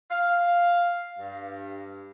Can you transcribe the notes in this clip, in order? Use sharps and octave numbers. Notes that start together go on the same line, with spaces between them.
F5
G2